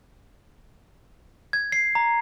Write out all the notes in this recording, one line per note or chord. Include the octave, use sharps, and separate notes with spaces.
G#6
C7
A#5